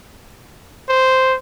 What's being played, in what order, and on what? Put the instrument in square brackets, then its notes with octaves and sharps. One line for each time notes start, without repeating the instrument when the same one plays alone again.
[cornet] C5